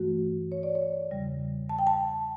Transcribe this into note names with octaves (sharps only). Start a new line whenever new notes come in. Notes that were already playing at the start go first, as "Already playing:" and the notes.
Already playing: G2 E3 A3 F#4
C#5
D5
C#5
E2 C#3 G3
A5
G5
A5